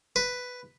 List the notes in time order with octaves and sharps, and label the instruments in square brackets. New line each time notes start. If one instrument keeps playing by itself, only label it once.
[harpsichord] B4